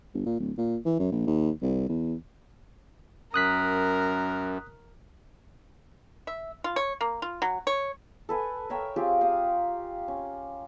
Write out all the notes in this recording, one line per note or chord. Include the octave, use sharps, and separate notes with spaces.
G1
A#2
D1
A#2
E3
F#2
A#1
D#2
C2
E2
F#2 A#4 D#6 F#6 B6
E5
F4
C#5
A#3
F4
F#3
C#5
A4 B4 G#5
A#4 C#5 E5 G5
C4 F4 G4 G#4
G4 F5 D#6
C#4